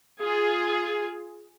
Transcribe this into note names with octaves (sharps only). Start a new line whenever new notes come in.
F4 G#4